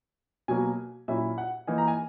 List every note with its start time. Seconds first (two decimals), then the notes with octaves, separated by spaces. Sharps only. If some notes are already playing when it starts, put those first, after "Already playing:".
0.48 B2 F#3 A#3 G#5
1.08 A#2 F#3 C#4 E4 E5
1.38 F#5
1.67 E3 A#3 D#4 G#5
1.78 A#5
1.88 G#5